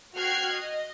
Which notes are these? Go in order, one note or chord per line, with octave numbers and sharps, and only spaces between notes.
F#4 G5 F6 F#6 G#6 C7
D#5